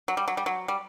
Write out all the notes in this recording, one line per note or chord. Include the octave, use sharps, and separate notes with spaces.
F#3
G3
F#3
G3
F#3
G3